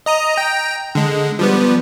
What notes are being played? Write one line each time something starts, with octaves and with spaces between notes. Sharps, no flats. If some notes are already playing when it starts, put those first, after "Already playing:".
D#5 A#5 D#6
G5 A#5
D3 G#3
F3 G3 B3